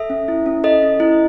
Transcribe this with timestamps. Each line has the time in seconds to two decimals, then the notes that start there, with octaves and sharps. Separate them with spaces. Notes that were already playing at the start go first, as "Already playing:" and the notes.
Already playing: A4 E5
0.10 C#4
0.28 E4
0.46 C#4
0.64 A4 D#5
0.82 C#4
1.00 E4